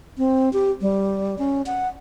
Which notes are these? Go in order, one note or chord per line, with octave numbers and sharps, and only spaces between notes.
C4
G4
G3
C#4
F#5